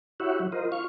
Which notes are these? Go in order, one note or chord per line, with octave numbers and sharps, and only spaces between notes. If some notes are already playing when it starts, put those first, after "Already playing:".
E4 F#4 G4 C#5 E5 F#5
F#3
F4 A#4 C5 D#5
F4 F5 C#6